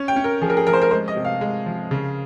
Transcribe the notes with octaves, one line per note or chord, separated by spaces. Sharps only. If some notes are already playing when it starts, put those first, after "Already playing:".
Already playing: C#4
G5
C#4
A#4
F3 G#4
A#4
G#4
F3 A#4
C5
A#4
G#3 C5
D#5
C3
F5
G#3
F3
C#3